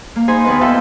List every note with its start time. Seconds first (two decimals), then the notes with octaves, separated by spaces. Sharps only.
0.16 A#3
0.28 D#4 G#4 C5 G#5 B5
0.44 D#2 B3 B4 D#5
0.61 F4 A4 B4 E5 G5